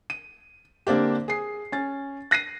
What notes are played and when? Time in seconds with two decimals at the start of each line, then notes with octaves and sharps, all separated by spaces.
0.10 D#7
0.87 D3 A#3 C4 D4 G4
1.28 G#4 C7
1.72 C#4 A6
2.31 F#6 A#6 C7 D#7